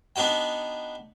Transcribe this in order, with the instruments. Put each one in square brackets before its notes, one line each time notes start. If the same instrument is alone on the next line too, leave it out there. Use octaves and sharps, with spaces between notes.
[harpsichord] B3 D4 D#4 F#4 G5